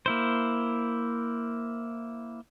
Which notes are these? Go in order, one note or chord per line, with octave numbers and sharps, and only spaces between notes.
A#3 E4 C5